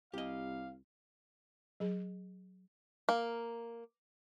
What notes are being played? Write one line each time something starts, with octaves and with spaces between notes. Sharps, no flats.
C2 G4 D#5 F5
F#3 G#4
A#3